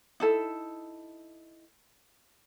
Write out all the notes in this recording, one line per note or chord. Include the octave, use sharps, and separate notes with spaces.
D#4 E4 A4